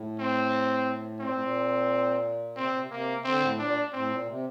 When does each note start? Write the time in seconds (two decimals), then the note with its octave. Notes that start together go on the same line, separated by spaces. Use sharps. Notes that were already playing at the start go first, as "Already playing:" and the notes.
Already playing: A2
0.19 C4
1.20 A#2 C4
1.30 A2
1.40 A#2
2.56 C3 C4
2.68 A#2
2.79 C3
2.91 C3 A#3
3.18 C3
3.24 D3 C4
3.41 A2
3.58 A#2 D4
3.93 A2 C4
4.10 A#2
4.28 C3